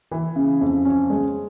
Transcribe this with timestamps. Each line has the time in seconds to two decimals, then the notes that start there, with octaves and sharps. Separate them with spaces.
0.11 E3
0.36 C#3
0.61 F2
0.85 C#4
1.10 G#3